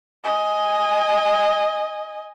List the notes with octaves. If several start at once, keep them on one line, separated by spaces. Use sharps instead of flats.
D#5 G#5